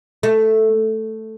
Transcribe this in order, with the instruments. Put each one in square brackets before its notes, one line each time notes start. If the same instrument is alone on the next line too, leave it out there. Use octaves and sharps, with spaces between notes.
[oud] A3